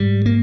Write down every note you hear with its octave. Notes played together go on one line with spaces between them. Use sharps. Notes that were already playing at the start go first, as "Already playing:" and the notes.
Already playing: G#2 G3
A#3